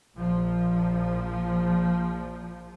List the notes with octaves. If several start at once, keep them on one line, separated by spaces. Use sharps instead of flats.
A#1 F3